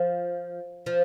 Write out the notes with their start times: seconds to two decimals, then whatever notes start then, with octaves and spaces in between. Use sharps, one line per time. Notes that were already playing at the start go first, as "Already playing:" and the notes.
Already playing: F3
0.86 F3